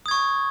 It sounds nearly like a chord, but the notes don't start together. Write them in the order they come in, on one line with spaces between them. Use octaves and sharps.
D#6 G#6 C#6